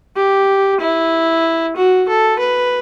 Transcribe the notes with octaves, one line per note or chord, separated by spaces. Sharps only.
G4
E4
F#4
A4
B4